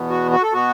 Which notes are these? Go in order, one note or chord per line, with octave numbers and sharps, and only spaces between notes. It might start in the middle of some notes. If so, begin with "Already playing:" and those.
Already playing: E2 B2 B3
F#4
F#4
A4
B2 B3 F#4